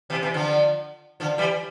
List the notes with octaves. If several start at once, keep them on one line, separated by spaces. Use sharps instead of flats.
C3 E3
C3 E3
D3 F3
D3 F3
E3 G3